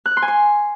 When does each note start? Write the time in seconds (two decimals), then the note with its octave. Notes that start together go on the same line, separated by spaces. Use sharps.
0.06 F#6
0.11 F6
0.17 C6
0.22 G#5
0.28 C6